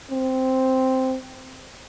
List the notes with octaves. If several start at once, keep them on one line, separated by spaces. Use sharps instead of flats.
C4